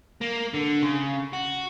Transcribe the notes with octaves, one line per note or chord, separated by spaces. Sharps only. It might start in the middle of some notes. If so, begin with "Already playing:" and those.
A#3
D3
C#3
F#4